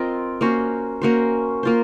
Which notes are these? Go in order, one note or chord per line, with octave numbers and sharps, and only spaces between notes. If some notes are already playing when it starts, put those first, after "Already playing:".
Already playing: C4 F4 A#4 D#5
A#3 C#4 F#4 C5
A#3 C#4 F#4 C5
A#3 F4 C5